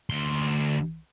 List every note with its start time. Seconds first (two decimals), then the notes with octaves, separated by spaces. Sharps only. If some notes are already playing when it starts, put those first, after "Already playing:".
0.10 D2 C6